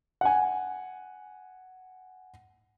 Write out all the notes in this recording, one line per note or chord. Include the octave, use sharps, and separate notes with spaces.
F#5 G#5